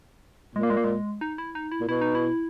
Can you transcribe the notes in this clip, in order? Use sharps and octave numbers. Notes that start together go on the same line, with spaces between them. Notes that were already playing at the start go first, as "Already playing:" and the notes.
A#2 G#3
A#3
G#3
A#3
G#3
D#4
E4
D#4
E4
A#2
B2 E4
D#4
E4